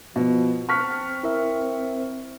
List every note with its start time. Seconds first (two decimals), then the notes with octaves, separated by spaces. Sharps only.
0.16 B2 F3
0.69 C4 A5 C#6 F6 F#6 B6
1.23 E4 A#4 E5